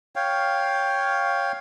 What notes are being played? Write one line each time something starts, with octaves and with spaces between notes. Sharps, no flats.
C#5 F5 G5